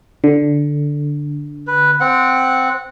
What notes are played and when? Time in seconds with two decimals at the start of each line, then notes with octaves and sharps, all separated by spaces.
0.24 D3
1.67 B4
2.00 C4 F#5